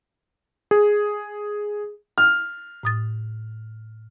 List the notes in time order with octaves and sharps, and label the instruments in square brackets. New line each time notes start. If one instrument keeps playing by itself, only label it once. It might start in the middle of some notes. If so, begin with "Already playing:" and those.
[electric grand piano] G#4
[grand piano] F6
[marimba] A2 D#6 A6